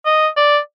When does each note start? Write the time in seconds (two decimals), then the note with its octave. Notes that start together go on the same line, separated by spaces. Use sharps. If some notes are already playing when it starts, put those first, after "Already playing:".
0.06 D#5
0.37 D5